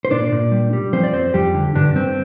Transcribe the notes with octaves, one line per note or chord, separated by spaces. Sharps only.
C5
A#2 D4 D5
A#2
G3
G3
F3 C4 C5
D5
F2 C4 C5
F2 G3 G4
D3
G2 D3 D4
G2 C4